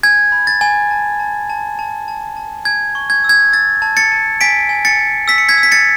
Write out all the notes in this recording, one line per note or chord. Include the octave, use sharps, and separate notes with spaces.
G#5 G#6
B5
A6
G#5
A5
A5
A5
A5
A5
A5
G#5 G#6
C#6
G#6
E6
G#6
E6 A6
A5
A6 C#7
A5
G#5 B6 D7
G#5
A6 C#7
G#5
E6 B6
C#7
G#6 B6
E6
B6
A6 C#7